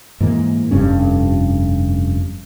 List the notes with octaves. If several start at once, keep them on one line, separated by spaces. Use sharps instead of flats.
G#2 E3 A#3
F1 G2 C#4